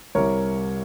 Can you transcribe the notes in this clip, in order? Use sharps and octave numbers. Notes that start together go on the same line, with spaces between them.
C2 C3 G3 A#4 C#5